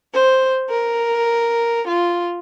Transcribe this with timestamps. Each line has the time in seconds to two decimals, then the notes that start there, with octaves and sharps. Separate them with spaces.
0.13 C5
0.69 A#4
1.86 F4